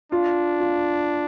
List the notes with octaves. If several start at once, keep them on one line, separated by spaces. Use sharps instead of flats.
D4 F4
F4